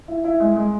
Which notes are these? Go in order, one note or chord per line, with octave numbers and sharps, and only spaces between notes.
E4
E4
G#3
G#3